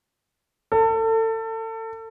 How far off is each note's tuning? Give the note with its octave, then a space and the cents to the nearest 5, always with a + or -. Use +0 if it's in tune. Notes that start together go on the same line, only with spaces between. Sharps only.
A4 +30